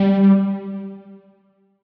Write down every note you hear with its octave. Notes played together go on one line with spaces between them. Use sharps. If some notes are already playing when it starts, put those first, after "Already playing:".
Already playing: G3